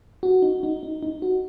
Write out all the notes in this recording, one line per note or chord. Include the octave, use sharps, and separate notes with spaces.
F#4
D#4
D#4
D#4
D#4
F#4